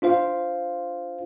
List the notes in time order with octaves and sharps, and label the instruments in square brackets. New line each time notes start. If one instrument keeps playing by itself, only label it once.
[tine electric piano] D4 F4 C5 F5